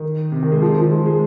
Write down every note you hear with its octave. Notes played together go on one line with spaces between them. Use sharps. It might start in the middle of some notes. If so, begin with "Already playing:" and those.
Already playing: D#3
C3
D#3
G#3
F3
D#3
F3
G#3
G#3